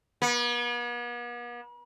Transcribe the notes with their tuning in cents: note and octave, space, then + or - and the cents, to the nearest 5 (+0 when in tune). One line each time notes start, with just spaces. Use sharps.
B3 -45